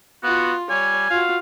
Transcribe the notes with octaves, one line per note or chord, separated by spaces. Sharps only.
B3 F4 F#4
G3 C#5 G#5
F4 F#4 F5